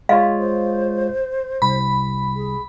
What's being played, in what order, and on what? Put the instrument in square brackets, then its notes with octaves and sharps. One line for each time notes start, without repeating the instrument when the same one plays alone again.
[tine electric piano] G#3 F4 C#5 [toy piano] F5
[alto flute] C5
[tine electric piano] C2 [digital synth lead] B5
[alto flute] G#4